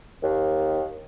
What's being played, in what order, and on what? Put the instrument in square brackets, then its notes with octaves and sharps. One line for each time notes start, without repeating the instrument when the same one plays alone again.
[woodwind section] D#2